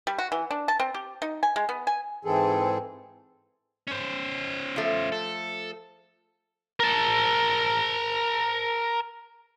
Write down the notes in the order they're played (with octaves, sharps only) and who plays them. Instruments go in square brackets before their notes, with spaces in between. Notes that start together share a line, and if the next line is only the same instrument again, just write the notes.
[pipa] G3
F#4
E3
D4
A5
C4
G4
D#4
G#5
G#3
B3
G#5
[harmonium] G#2 E3 C4 G#4 A4
[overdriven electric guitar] C#4 C5
[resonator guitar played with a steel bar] F3 A3
[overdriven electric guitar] A4
[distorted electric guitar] A#4 A5